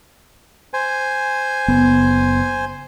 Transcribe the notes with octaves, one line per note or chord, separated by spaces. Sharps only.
C5 G#5
F#1 B3